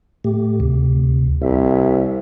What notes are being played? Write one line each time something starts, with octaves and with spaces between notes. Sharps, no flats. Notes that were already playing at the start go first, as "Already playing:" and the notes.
A2 A3 G4
D2 C3
C2 E5